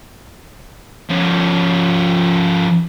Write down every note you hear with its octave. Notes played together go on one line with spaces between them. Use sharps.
F3 C#4